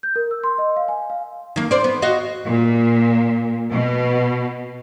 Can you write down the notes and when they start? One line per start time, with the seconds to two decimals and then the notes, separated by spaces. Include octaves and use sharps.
0.03 G6
0.16 A#4
0.31 E6
0.44 C6
0.58 D#5
0.77 F5
0.88 G#5
1.10 F5
1.56 D#3 A#3
1.71 C5 D5
1.84 B3
2.02 F#4 D#5 F5
2.45 A#2
3.71 B2